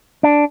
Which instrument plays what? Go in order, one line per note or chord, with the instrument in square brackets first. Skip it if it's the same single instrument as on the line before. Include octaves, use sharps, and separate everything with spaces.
[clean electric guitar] D4